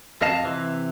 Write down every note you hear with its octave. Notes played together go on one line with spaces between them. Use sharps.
F2 D#5 F5 A5
C3 E3